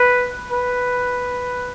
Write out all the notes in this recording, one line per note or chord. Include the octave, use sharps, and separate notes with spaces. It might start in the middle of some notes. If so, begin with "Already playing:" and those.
Already playing: B4
B4